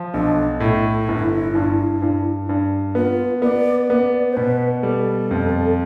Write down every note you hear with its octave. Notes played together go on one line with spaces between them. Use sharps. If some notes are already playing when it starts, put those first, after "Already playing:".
Already playing: F3
B1 D4
A2 E4
G1
G2
G2
G2
B3 F4
B3 D5
B3 D5
C5
B2 B4
G3 A4
F2